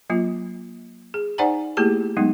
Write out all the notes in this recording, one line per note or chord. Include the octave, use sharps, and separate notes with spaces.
F#3 A#3 F4
G#4
D#4 C5 D5 F#5 G#5 A#5
A3 A#3 E4 G4 G#4 A5
F#3 G#3 B3 D#4